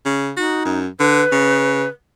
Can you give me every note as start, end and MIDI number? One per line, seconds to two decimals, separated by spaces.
0.05 0.31 49
0.37 0.78 63
0.37 0.61 66
0.65 0.87 42
1.00 1.23 50
1.00 1.89 71
1.32 1.85 49